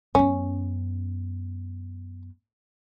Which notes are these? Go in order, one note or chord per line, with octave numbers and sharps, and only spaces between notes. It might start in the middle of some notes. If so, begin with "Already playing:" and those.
F#2 B3 C#4